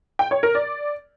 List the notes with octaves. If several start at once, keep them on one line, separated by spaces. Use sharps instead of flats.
G5
C#5
A#4
D5